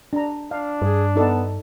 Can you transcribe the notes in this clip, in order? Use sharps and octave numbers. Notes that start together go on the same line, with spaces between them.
D4 A#5
D4 F5
G2 G#4
B3 D#4 A4 D5